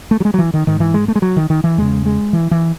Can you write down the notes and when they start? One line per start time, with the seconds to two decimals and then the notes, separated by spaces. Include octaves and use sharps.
0.11 A3
0.20 F#3
0.25 G#3
0.34 F#3
0.38 E3
0.54 D#3
0.67 G#2 D#3
0.80 E3
0.94 G#3
1.08 A3
1.16 G#3
1.22 F#3
1.36 D#3
1.50 D#3
1.64 E3
1.78 E2 C#3 G#3
2.06 G#3
2.33 E3
2.51 E3